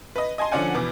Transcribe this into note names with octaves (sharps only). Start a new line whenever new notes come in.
B4 D#5
D#5 G#5 A5 C6
D3 F3 C#4 D5 F#5 G#5
E2 B2 B3 D6